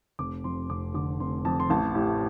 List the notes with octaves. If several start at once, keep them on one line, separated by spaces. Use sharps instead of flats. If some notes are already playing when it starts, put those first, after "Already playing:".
F1 D6
F2 C6
F1 D6
D3 D6
F1 C6
F2 A5
C6
A1 A5
A2 G4